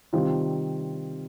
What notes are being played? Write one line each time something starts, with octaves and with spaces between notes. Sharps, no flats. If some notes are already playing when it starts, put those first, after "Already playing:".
C3 D#3 G3 C4 F4